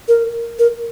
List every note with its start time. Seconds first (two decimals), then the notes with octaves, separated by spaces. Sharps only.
0.08 A#4
0.59 A#4